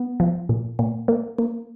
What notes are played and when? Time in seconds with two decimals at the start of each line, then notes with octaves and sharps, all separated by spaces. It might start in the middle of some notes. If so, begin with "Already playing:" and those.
Already playing: B3
0.20 F3
0.49 A#2
0.79 A#2
1.08 A#3
1.39 A#3